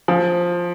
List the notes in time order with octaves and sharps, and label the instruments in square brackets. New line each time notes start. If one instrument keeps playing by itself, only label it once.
[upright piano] F3